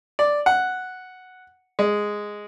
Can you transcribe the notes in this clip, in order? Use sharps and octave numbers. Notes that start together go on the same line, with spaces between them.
D5
F#5
G#3